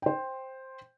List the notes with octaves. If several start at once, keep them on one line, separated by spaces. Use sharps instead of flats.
C5 G5